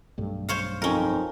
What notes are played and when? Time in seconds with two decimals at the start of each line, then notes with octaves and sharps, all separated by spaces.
0.18 B1 G2 A3
0.49 C5 C#5 F5
0.82 F2 C#4 D#4 A#4